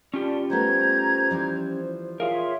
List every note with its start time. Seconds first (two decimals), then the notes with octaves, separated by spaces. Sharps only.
0.14 C#4 F4 G4 D5 A5
0.50 G3 A3 B3 C5 A#5 G6 G#6
1.30 E3 F3 G3
2.20 F4 G#4 A#4 C#5 E5 F5 C6